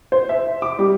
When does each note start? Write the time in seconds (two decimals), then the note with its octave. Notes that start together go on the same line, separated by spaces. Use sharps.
0.12 C5
0.29 E5
0.62 D6
0.79 G3